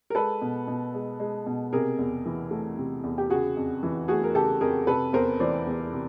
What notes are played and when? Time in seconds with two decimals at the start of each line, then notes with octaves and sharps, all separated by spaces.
0.10 A#4
0.15 G#3 A4 B4
0.42 B2
0.68 B2
0.94 G#3
1.20 G#3
1.46 B2
1.73 C3 G#4 A#4
1.99 E2
2.25 E3
2.51 A3
2.77 C3
3.04 E2
3.18 G4
3.30 C#3 F#4 G#4
3.57 F2
3.83 E3
4.08 A3 F#4 G#4
4.24 A#4
4.34 C#3 G4 A4
4.61 F2 G#4 A#4
4.87 C3 A4 B4
5.13 E2 A#4 C5
5.40 E3 C5 D5
5.66 E2
5.93 C3